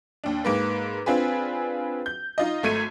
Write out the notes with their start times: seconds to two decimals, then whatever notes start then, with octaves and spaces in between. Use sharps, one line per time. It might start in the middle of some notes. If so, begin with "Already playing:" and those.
0.24 D#2 D4
0.45 G#2 A#3 B4
1.06 C4 D4 F4 G#4 B4
2.06 G6
2.38 D#4 F4 D#5
2.63 G#1 A3 G#6 C#7 D#7